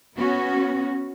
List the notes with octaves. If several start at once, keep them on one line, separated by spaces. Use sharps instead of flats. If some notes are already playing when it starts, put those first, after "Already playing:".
B3 C#4 F#4